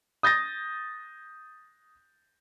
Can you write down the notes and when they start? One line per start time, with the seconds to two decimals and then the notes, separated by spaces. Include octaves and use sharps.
0.23 D#6 G6 A6 A#6